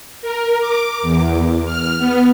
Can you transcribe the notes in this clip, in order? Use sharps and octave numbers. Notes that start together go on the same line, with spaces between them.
A#4
D6
E2
F6
B3